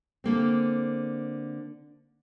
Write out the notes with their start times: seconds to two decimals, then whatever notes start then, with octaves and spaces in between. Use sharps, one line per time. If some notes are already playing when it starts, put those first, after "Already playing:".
0.24 D3 A#3 C4